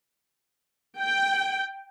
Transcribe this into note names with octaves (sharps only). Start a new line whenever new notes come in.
G5